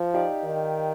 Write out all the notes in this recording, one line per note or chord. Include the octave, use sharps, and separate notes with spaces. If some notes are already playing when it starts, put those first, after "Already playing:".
Already playing: F3
D#4 G4 D5 F5
D#3